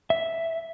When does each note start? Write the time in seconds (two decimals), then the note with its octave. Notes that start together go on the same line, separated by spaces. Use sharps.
0.10 E5